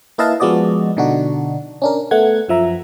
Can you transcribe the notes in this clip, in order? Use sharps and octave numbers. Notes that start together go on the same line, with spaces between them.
A#3 E4 B4 D#5 F5 A5
F3 G#3 B3 F#4 D5 D#5
B2 D3 D4 D#4 F#4
C#4 D4 A#4
A3 B3 F#5 G#6
F#2 F3 E5 A#5